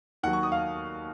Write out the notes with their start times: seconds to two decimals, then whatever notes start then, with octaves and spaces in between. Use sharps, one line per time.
0.23 D#2 D#3 F#3 F#5
0.33 C#6
0.43 D#6
0.52 F5